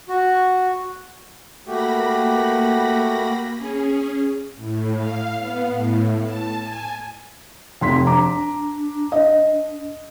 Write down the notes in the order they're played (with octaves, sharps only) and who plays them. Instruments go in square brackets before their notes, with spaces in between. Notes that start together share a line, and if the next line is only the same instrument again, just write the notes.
[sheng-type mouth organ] F#4
[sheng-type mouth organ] A3 F#4 G4 [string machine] A#3 B5 A#6
[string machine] C#4 G#4
A2
F5
B3
A2
A5
G#5
[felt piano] F1 C6 B6 [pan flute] C4
[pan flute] D4 [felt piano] A#5 D6
[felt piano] D#5